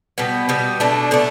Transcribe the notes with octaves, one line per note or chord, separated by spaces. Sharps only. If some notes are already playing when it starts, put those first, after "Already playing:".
B2 G3 B3
B2 G3 B3
B2 A3 D4
B2 A3 D4